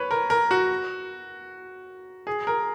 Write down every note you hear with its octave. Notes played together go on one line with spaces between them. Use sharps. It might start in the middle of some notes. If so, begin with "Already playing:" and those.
Already playing: B4 C#5
A#4
A#4
F#4
G#4
A#4